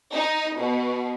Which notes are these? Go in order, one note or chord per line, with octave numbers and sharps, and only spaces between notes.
D#4
B2